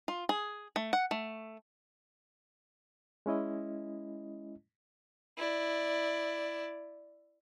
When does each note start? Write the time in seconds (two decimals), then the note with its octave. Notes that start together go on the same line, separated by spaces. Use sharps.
0.08 F4
0.29 G#4
0.76 A3
0.93 F#5
1.11 A3
3.26 G#3 C#4 E4 D#5
5.37 E4 D5